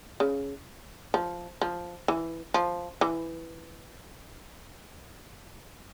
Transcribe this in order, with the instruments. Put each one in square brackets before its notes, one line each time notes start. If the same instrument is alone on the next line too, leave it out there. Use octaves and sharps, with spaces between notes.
[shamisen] C#3
F3
F3
E3
F3
E3